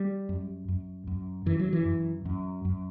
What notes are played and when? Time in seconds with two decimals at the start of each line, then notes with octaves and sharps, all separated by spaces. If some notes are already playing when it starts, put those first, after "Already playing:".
Already playing: G3
0.29 F#2
0.68 F#2
1.07 F#2
1.46 F#2 E3
1.59 F#3
1.73 E3
1.85 F#2
2.25 F#2
2.65 F#2